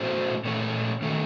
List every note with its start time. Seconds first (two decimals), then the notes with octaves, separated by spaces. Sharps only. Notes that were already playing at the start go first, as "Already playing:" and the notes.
Already playing: A2 A3 C#4 F#4 C5
0.45 A#2 A3 C#4 A4 C#5
1.02 D#3 A3 C#4 A4